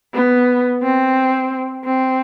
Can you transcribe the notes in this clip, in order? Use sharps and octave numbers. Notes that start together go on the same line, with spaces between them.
B3
C4
C4